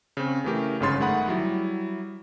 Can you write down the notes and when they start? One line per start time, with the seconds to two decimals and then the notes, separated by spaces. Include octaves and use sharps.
0.17 C#3 C4
0.44 C#3 E3 A3 G4 A#4
0.80 G1 G#2 C#3 C#5 C6 A6
0.99 G1 D#3 A3 G#4 F#5 B5
1.28 F#3 G3 E4